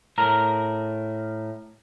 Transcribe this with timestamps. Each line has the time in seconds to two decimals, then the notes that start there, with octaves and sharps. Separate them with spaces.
0.18 A2 A#4 A#5